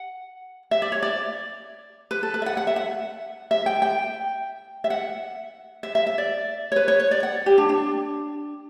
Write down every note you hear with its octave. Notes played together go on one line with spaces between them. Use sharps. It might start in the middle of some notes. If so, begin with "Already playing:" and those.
Already playing: F#5
E5
D5
C#5
D5
B4
A4
B4
E5
F#5
F#5
E5
F#5
E5
G5
G5
E5
F#5
E5
E5
E5
D5
C#5
B4
C#5
C#5
D5
F#5
G4
D4
D4